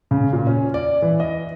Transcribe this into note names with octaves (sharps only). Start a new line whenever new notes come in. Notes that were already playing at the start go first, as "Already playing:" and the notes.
C#3
A#2
C#4
D5
E3
D#5